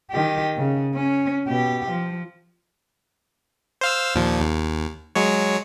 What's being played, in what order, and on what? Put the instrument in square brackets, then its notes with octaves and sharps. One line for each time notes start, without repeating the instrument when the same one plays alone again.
[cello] D#3 G4
C#3
C#4
B2 G4
F3
[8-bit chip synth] C5 F5 E6
D#2 A#2 F3
D#2
F#3 G#3 C#5